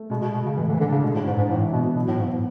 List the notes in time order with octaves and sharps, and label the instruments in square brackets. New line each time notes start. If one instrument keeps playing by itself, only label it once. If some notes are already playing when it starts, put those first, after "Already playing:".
Already playing: [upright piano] A3
[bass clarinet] B2 [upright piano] G#3
[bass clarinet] B2
[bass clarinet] B2 [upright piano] G#4
[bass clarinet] C#3
[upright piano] A2 [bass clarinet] E3
[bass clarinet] D3
E3
[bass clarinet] D3 [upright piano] D4
[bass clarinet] C#3
[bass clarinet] B2 [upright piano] G#3
[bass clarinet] A2
[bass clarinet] G#2 [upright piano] D4
[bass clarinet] G#2
[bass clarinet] A2 [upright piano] E3
[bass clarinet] B2 [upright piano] B3
[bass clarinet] B2 [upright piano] F#3
[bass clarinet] A2
[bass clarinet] G#2 [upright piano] B2